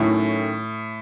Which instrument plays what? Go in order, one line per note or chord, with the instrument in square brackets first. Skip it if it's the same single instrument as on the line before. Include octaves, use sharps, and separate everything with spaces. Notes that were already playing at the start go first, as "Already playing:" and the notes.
Already playing: [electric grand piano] A2 [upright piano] D#3 F#3 A3 C#4 E4